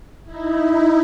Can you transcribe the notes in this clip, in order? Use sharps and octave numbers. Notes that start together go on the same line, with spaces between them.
D#4 E4